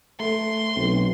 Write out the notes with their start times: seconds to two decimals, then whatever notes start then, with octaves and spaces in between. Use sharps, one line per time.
0.20 A3 A4 C6
0.76 B1 C4